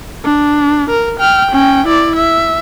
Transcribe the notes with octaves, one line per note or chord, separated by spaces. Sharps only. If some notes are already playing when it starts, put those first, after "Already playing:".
D4
A#4
G5 F6
C#4 G5
E4 D5
E5